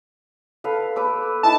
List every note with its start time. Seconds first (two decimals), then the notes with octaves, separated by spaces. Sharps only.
0.64 A4 B4 F5
0.96 B4 D6 E6
1.43 D#4 E4 A5